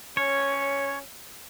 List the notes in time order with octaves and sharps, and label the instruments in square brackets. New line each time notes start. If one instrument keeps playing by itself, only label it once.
[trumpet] C#4 [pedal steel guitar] C#5